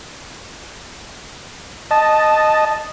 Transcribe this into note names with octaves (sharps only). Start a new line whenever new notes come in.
D#5 A5